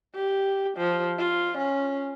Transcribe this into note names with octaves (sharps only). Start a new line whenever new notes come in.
G4
F3
F4
C#4